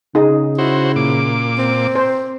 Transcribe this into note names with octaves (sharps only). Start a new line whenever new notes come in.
C#3 D#4 G#4
E4 F#4 C5
A#2 D6
C4
C5